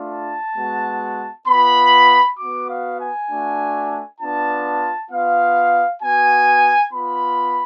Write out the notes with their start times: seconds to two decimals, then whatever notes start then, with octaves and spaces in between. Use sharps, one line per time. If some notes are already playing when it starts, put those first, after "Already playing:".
Already playing: A3 D4 F4
0.10 A5
0.56 G#3 B3 F#4
1.47 B3 F4 B5
2.38 B3 F#4 D6
2.69 F5
2.99 G#5
3.30 A3 D4 F#4
4.20 B3 D4 F4 A5
5.11 B3 F4 F5
6.02 B3 F#4 G#5
6.93 B3 F4 B5